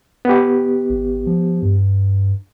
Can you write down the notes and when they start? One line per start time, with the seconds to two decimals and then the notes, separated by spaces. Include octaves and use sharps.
0.25 B3 G4
0.90 G#1
1.26 F3
1.62 G2